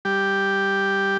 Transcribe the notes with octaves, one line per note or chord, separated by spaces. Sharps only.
G3 G4